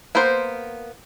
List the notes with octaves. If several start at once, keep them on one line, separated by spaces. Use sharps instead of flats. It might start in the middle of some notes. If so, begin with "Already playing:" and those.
A#3 B3 A#4 C5